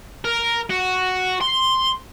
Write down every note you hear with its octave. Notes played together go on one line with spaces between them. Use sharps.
A#4
F#4
C6